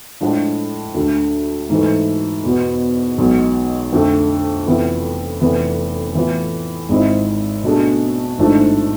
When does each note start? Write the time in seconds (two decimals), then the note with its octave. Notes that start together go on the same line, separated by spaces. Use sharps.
0.21 A2 F3 G#3 D4 F4
0.95 D2 D3 A3
1.70 G#2 E3 A3
2.43 E2 B2 B3
3.18 B1 B2 G#3
3.92 F2 D3 A3
4.66 F1 F2 E3 B3 E4
5.40 F1 F2 E3 B3
6.15 A2 E3 B3 F4
6.89 G#1 G#2 G#3 C4 E4
7.63 B2 A3 D4 G#4
8.38 A1 G#2 F3 A3 D4